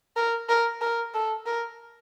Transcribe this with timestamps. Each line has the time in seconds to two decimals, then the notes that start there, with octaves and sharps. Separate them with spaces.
0.16 A#4
0.49 A#4
0.81 A#4
1.14 A4
1.46 A#4